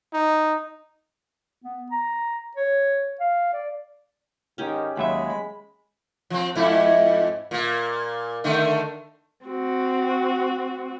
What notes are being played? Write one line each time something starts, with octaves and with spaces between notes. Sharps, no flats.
D#4
B3
A#5
C#5
F5
D5
G#2 D#3 C#4 G4
D#2 F#3 G#3 E5 B5
F3 C4
F2 G#2 E4
A#2 A#3
D3 D#3 A3
C4 F#4